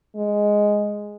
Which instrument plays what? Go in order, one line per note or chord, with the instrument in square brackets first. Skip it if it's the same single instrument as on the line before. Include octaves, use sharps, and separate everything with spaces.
[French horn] G#3